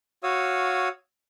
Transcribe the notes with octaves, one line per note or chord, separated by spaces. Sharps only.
F#4 C#5 F5 D#6 E6